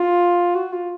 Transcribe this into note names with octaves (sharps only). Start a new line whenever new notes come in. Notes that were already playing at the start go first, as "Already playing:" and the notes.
Already playing: F4
F#4
F4